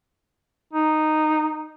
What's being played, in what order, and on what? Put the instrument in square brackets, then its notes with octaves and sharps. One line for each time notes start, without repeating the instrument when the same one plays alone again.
[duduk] D#4